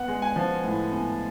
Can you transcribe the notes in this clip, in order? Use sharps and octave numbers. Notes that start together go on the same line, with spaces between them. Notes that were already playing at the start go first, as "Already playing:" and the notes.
Already playing: B3 F#5
G#3
G#5
F3
A2
B3